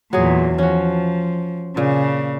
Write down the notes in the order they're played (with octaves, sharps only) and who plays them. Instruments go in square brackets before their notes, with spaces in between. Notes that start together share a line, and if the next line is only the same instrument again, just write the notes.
[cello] E2 A#2 [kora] F#3 G#4
[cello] F3 [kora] C#4 F#4
[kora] A#2 [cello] C#3